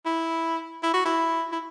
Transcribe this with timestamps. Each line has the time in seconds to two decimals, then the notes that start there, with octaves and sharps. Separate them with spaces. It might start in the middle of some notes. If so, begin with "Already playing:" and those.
0.05 E4
0.83 E4
0.94 F#4
1.05 E4
1.52 E4